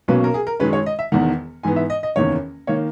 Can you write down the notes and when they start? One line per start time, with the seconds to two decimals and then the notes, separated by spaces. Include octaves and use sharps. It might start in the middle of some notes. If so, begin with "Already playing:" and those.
0.08 B1 B2 F#3 A#3 C#4 B4
0.24 A#4
0.34 G#4
0.47 A#4
0.60 F#2 D#3 G#3 C#4 B4
0.73 C#5
0.86 D#5
0.99 E5
1.12 E1 E2 D#3 F#5
1.63 G#2 E3 B3 G#5
1.76 E5
1.90 D#5
2.03 D#5
2.16 F#1 E2 D#3 A#3 C#5
2.67 D#3 A#3 C#5